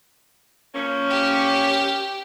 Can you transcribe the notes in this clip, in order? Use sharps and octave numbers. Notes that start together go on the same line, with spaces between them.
F3 A#3 C#4
G4